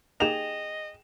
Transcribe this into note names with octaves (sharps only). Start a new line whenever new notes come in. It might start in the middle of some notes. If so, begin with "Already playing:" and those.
A#3 D#4 G4 G#4 D#5 G5 E7 F7